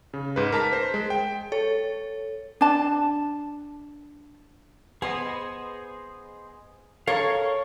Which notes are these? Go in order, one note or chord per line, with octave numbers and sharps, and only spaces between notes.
C#3
G#2 B4
A#4 A5 B6
C5
G#3
G5
A4 C#5
D4 A5
B3 G#4 C5 D#5
A4 A#4 C#5 F5 C#6